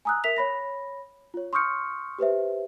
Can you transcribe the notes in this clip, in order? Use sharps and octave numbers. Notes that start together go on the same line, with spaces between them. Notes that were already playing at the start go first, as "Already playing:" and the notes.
G#5 A#5 D#6 E6 F#6
A#4 E5 B6 F7
C#5 B5 A#6
F4 C#5
C6 C#6 D#6 F6 G6 C#7
G4 B4 C5 E5